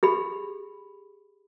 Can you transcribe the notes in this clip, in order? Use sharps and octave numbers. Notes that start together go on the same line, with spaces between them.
G4 G#4 B5